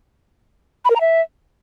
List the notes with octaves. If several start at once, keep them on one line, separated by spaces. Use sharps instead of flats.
B5
A#4
A#5
E5